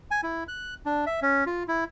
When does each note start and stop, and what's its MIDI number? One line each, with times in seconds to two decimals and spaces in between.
0.11 0.21 80
0.23 0.44 64
0.48 0.74 90
0.86 1.05 62
1.06 1.20 76
1.22 1.44 61
1.46 1.63 65
1.68 1.84 64